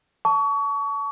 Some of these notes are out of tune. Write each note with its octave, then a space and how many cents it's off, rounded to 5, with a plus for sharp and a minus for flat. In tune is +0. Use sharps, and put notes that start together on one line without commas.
A5 +0 C#6 +30